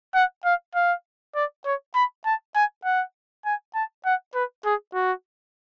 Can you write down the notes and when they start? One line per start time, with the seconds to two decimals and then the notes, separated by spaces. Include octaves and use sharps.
0.15 F#5
0.45 F5
0.75 F5
1.35 D5
1.66 C#5
1.95 B5
2.25 A5
2.55 G#5
2.85 F#5
3.46 G#5
3.75 A5
4.05 F#5
4.35 B4
4.65 G#4
4.94 F#4